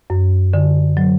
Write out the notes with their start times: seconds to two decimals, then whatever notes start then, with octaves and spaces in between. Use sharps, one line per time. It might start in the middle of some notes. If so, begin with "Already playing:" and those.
0.10 F#2
0.53 D3
0.97 F#3